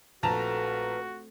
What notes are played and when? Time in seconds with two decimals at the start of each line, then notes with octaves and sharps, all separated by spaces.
0.23 A#1 A3 C4 F#4 B4 A5 A#5